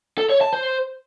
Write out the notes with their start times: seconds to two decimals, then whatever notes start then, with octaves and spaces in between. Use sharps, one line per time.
0.18 A4
0.29 C#5
0.41 A5
0.53 C5